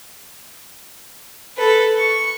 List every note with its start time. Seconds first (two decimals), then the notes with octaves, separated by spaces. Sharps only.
1.57 A4 B4
1.98 C#6